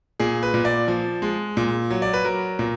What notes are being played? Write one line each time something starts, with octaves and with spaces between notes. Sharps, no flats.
A#2 G#4
B4
A#2
D5
F3
G#3
A#2
F#3
D5
B4
F#3 A#4
A#2